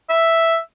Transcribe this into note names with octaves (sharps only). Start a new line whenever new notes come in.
E5